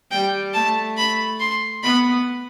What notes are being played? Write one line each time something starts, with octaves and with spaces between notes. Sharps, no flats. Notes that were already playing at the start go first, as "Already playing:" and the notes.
G3 G5
A3 A5
B5
C6
B3 B5